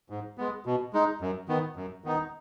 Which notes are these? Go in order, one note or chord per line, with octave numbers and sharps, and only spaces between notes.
G#2
G#3 B3
B2
G#3 D#4
F#2
D#3 B3
F#2
D#3 B3 D#4